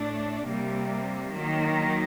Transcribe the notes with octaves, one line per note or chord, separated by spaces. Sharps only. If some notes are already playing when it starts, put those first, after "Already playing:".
Already playing: A2 A3 D4
C3 G3 A#3
D#3 F#3 A#3 D#4